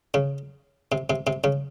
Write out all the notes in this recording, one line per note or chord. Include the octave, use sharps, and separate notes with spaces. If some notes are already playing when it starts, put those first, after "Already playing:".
C#3
C3
C3
C3
C#3